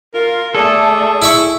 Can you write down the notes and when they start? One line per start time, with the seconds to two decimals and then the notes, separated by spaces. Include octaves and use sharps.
0.14 F4 A#4
0.55 A3 G#4 A4 D5
1.22 E4 E5 C#6